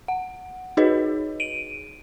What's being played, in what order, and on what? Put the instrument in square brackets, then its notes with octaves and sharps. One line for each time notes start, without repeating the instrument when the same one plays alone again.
[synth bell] F#5
D#4 F#4 G#4 B4 C#5 D#5
D7 D#7